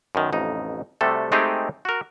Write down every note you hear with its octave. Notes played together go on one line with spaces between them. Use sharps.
F#2 B2 D#3
A1 F2 D#4
C3 G3 A3 F#4 A4
G#3 A3 C4 D#4 G4 G#4
F#4 A#4